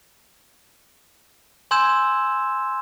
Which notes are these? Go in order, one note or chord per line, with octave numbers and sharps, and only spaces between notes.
G#5 C6 E6 G6 G#6 E7